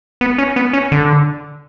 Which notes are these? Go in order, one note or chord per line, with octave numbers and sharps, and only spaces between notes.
B3
C#4
B3
C#4
D3